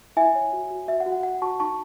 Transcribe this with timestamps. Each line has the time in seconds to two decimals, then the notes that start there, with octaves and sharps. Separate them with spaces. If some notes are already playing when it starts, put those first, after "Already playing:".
0.17 E4 E5 G#5
0.35 C#5
0.53 F#4
0.70 F#4
0.88 F#4 E5
1.00 F#5
1.06 F#4
1.12 F#5
1.23 F#4 F#5
1.42 F#4 A5 C#6
1.60 D#4 A5 C#6